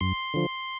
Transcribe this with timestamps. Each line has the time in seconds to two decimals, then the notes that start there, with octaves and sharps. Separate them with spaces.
0.01 F#2 C6
0.34 D3 F3